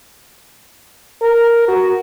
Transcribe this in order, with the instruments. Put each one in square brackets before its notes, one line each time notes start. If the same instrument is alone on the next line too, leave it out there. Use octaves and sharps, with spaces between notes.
[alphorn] A#4
F#4